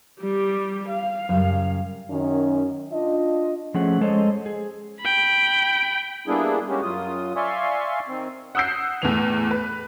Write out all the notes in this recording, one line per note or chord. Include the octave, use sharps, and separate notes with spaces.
G3 G4
F5
F#2 C#3 G3
F#2 D#3 C#4
D4 F4 D#5
F3 A3 C#4 G#4 F#5
G#3 A4 C5 C#5 D#5
G#4
G5 B5
G3 A#3 B3 D4 E4 G#4
G3 G#3 A#3 C#4 F#4 G4
F#2 F#3 F4 D#6
D5 E5 F5 G#5 C6 C#6
D#3 C4
F#5 D#6 E6 G6 C7
E2 A2 E3 F7
B4